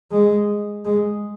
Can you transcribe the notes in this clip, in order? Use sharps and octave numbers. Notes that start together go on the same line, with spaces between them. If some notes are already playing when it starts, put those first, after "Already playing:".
G#3
G#3